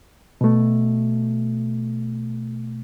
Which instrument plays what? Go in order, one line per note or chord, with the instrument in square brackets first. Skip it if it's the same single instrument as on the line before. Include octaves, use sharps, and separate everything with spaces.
[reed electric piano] B2 A3